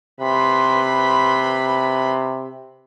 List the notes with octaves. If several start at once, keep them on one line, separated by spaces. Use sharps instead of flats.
C3 B4 B5 C6